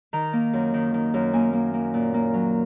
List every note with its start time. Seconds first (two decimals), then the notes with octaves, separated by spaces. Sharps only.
0.13 D#3 A#5
0.33 A#3
0.53 F#2
0.74 D#3
0.94 D#3
1.14 F#2
1.33 A#3 G#5
1.53 A#3
1.74 A#3
1.94 A#2
2.14 A#3
2.34 F#3